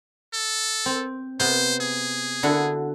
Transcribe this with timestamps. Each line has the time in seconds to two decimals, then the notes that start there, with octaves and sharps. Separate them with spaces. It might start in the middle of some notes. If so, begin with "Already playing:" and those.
0.33 A4
0.86 C4
1.40 C3 B3 C5
1.81 G#4
2.43 D3 E4 F#4